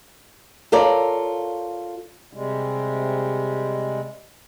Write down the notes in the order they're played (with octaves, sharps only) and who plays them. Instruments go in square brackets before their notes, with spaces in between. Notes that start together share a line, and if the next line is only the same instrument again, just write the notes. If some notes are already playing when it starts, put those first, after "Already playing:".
[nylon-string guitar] F4 A4 A#4 C#5 D5
[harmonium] C3 G3 G#3